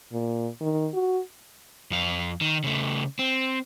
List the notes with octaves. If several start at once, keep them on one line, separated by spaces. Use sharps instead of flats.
A#2
D#3
F#4
F2 F5
D#3
C#3 A3
C4